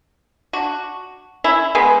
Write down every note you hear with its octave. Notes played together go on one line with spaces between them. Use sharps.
D4 F#4
C#4 E4
G#3 B3